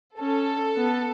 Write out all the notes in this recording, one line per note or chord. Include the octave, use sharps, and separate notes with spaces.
C#4 A4
B3